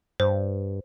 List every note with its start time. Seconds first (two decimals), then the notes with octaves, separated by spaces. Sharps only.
0.20 G2 C5